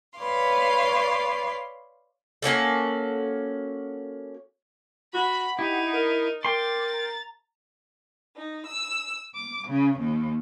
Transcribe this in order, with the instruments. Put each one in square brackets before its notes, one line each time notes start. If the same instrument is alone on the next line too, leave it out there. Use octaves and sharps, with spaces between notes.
[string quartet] B4 C#5 D5 F5 C6
[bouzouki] A#3 C#4 F#4 A4
[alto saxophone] F#4 [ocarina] F#5 [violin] B5
[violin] D#4 [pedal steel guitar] E4 [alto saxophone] G4
[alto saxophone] A#4
[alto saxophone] A#4 [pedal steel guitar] G5 C6 [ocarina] D6 [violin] A6
[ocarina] A#5
[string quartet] D#4
E6
D6
C#3
D#2